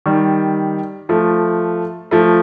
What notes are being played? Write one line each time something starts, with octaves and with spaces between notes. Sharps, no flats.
D#3 G3
F3 A3
F3 A3